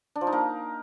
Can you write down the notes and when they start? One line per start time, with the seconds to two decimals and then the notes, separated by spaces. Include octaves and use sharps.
0.16 D4
0.21 F3
0.27 D#4
0.33 A#3